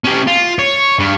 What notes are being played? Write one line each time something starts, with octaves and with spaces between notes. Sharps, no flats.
C#4 G4
F4
C#5
G2